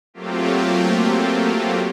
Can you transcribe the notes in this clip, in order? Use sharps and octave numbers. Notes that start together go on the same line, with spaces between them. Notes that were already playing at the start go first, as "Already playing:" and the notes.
F#3 A3 A#3 C4 F4 G4